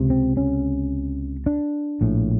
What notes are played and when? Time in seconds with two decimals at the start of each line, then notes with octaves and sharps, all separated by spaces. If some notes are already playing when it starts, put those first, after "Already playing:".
Already playing: C#2 C3
0.10 C4
0.37 C#4
1.46 D4
2.01 A#1 A2